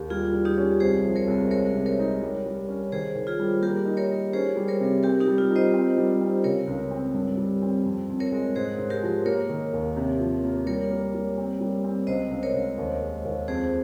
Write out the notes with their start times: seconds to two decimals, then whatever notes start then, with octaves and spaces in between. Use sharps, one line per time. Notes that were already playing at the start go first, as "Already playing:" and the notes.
Already playing: D#2 G4 A#4
0.10 G3 F4 G#4
0.33 G3
0.45 D#4 G4
0.57 C#4
0.80 C2 G#4 C5
1.05 F3
1.16 A#4 C#5
1.27 C2
1.51 G#3 A#4 C#5
1.74 C3
1.86 A#4 C#5
1.99 D#4
2.21 G3
2.46 G3
2.68 C#4
2.92 D#3 G#4 C5
3.16 D#3
3.27 F4 G#4
3.39 G3
3.62 A#3 G4 A#4
3.85 D#4
3.97 A#4 C#5
4.10 D#4
4.33 C#4 G#4 C5
4.56 G3
4.68 A#4 C#5
4.80 C3
5.03 C4 G4 A#4
5.20 D#4 G4
5.27 G3
5.38 F4
5.50 D#4
5.56 C5 D#5
5.73 C4
5.97 G3
6.20 C4
6.44 C#3 A#4 C#5
6.67 C#2
6.91 C4
7.14 G2
7.37 G3
7.62 C4
7.86 F2
8.09 F2
8.20 A#4 C#5
8.32 G#3
8.56 G#2 G#4 C5
8.78 G#2
8.90 G4 A#4
9.03 F3
9.26 A#3 A#4 C#5
9.49 D#3
9.73 D#2
9.97 C3
10.20 F3
10.44 A#3
10.66 G3 A#4 C#5
10.90 A#3
11.14 G3
11.37 C4
11.61 G3
11.84 C4
12.07 C#2 C5 D#5
12.31 C#2
12.43 A#4 C#5
12.54 C#2
12.78 D#2
13.02 G#3
13.25 D#2
13.48 F2 G#4 C5